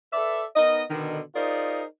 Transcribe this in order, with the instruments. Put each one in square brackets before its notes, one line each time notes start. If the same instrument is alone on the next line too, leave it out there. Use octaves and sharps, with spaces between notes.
[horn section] A4 B4 D5 E5
B3 D#4 A#4 D#5
B2 D3 D#3
D#4 F4 G#4 A#4 C5 D5